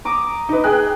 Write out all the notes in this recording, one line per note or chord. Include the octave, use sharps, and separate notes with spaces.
A#5 D6 D#6
D#4 B4
G#4 G5 F#6